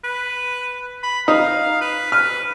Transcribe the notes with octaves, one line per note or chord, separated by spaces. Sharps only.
B4
B5
D#4 F5
B4
B4 F6